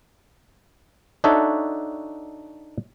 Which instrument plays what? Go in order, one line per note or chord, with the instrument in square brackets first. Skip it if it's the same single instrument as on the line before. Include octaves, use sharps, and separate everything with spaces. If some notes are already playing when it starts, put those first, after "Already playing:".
[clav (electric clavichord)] D4 D#4 F#4 A4 C#5 E5